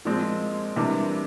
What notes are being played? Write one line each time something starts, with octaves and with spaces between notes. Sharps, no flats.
A#2 F3 G#3 C4
C3 E3 G3 A#3 D4